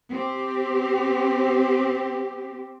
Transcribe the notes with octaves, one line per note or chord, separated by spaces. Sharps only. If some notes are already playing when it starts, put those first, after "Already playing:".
C4 G4